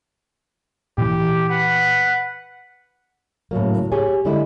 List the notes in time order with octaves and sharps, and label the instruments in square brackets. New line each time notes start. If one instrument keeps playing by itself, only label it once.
[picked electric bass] A#2 E3 [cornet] G4
[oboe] B4 [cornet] F#5
[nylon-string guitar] A2 C#3 F#3 A#3
G4 G#4 C#5 G#5
D3 G3 G#3 E4